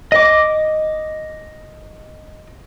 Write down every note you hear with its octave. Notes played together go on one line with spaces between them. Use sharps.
D#5 D6